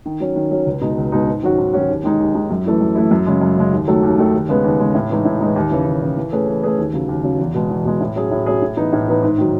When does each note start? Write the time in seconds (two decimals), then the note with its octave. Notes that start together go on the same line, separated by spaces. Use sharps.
0.06 D#3
0.20 F#3 C#4
0.36 D#3
0.51 F#3 C#4
0.66 C#2
0.81 B2 G#3 D#4
0.97 C#2
1.12 B2 G#3 D#4
1.27 G#2
1.43 D#3 F#3 C#4 F#4
1.58 G#2
1.73 D#3 F#3 C#4 F#4
1.89 D#2
2.04 D#3 G#3 D#4
2.19 D#2
2.35 D#3 G#3 D#4
2.50 F#2
2.65 E3 A3 E4
2.81 F#2
2.95 E3 A3 E4
3.11 F#2
3.26 C#3 G#3
3.41 F#2
3.57 C#3 G#3
3.72 D#2
3.87 D#3 F#3 A3
4.03 D#2
4.18 D#3 F#3 A3
4.33 D#2
4.48 C#3 G#3 B3
4.64 D#2
4.79 C#3 G#3 B3
4.94 A2
5.10 E3 G#3 D#4
5.25 A2
5.40 E3 G#3 D#4
5.56 D#2
5.71 C#3 E3
5.86 D#2
6.02 C#3 E3
6.17 E3
6.32 A3 C#4 G#4 B4
6.48 E3
6.63 A3 C#4 G#4 B4
6.78 D#2
6.93 C#3 F#3
7.08 D#2
7.24 C#3 F#3
7.39 E2
7.54 B2 G#3
7.70 E2
7.85 B2 G#3
8.00 A2
8.16 F#3 C#4 G#4
8.31 A2
8.46 F#3 C#4 G#4
8.62 A2
8.77 E3 B3 D#4
8.92 A2
9.08 E3 B3 D#4
9.23 G#2
9.38 D#3 F#3